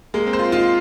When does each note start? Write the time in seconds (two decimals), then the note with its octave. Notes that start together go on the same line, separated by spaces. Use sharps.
0.14 G#3 A#3
0.26 C4
0.33 C5
0.39 F4
0.52 D#4 F4